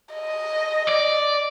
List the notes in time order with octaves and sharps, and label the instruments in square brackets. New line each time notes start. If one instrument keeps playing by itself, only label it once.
[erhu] D#5
[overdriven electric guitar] D5